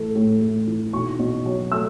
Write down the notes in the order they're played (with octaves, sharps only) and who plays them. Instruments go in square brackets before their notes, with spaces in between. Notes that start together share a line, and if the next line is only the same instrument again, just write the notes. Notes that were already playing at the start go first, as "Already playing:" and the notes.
Already playing: [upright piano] A2 E3 A3
A2
A2
E3
B1 C#6
B2
F#3
A3 E6